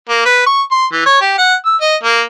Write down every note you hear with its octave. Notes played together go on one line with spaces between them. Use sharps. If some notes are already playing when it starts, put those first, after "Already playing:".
A#3
B4
C#6
C6
E3
C#5
G4
F#5
E6
D#5
A#3